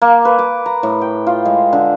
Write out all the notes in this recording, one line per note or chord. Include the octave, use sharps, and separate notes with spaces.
A#3
B4
D6
A#5
A2
G5
F4
G#3
D3